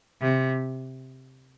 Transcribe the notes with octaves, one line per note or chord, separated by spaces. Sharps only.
C3